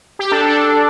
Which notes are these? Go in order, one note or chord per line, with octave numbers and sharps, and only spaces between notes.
G4
D4 A4
D4